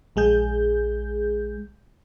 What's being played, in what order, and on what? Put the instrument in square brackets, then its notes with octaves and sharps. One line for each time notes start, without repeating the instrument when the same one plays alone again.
[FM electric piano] A#1 G#3 G#4 G6